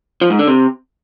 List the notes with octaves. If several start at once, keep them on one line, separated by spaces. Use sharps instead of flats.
F3
G#2
D3
C3